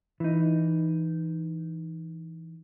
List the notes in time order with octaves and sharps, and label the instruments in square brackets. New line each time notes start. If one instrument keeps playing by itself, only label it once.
[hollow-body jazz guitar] E3 D#4